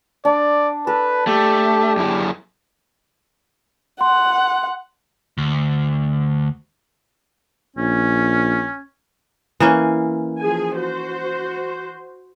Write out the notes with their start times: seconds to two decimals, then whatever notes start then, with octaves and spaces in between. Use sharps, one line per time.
0.25 D4 D5
0.87 A4 B4
1.27 A3 G4
1.97 F#2 E4
4.01 F#5 C6
5.38 D2
7.76 A#1 C#4
9.60 E3 A#3 C#4
10.40 F3 G#4 G#5
10.78 F#4 C5